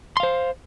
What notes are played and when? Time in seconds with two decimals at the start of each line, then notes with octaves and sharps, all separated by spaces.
0.17 C6
0.20 F5
0.23 C5